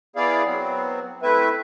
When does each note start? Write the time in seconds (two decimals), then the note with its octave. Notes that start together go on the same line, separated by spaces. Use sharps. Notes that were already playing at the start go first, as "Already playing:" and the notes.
0.16 B3 E4 G#4 D5 F5
0.45 F#3 B3 C4
1.23 A3 C4 E4 B4 E5